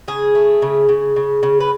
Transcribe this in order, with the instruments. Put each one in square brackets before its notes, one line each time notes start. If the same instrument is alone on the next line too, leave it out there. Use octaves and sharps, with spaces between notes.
[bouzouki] C#3 G#4
A3
C#3
C#3
C#3
C#3
B4